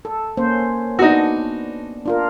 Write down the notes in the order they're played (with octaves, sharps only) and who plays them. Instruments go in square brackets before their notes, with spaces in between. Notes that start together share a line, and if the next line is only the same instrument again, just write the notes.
[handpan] A4
A#3 C#4 C5
[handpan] B3 D4 [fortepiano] D#4 F#4
[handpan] D4 F4 A#4